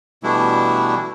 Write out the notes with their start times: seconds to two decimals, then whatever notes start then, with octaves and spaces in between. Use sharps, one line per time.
0.23 B2 E3 G3 A3 D4 E4